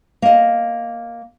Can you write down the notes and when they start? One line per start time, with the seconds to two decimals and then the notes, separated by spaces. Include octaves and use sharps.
0.22 A#3 D#5